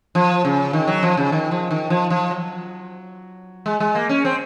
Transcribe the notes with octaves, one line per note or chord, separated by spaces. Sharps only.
F3
C#3
D#3
F#3
F3
C#3
D#3
F3
D#3
F3
F3
F#3
G#3
G#3
A#3
C#4
C4